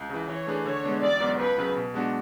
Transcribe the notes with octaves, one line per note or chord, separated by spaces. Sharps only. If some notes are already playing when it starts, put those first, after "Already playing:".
Already playing: C#2
C#3 E3
E3 C#5
A3 D4 G#4 B4
D3 C#5
G#3 B3 D4
A1 D5
G#2 F#3 B3
C#2 B4
C#3 F#3
B2
G#3 B3 D4 F#4